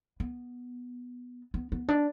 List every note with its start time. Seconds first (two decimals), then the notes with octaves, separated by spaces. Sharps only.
0.20 B3
1.54 B3
1.72 B3
1.88 D4